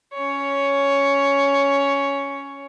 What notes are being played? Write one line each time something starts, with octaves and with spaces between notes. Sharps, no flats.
C#4 C#5